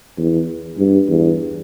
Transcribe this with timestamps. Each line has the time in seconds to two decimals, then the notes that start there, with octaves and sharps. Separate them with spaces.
0.18 E2
0.78 G2
1.09 E2